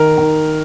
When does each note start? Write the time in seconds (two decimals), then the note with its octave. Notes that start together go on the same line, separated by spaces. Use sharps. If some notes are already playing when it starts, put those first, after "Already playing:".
Already playing: D#3 A#4
0.18 D#3